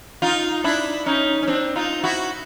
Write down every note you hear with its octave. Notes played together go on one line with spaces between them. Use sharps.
D#4 F4
D4 E4
C#4 D#4
C#4
C4 D4
D#4 F4
E4 F#4